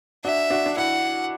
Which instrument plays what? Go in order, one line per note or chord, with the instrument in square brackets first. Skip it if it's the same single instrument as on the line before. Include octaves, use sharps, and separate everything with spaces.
[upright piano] D4 F#4 [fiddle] E5
[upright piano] D4 F#4
D4
[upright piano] E4 [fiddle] F#5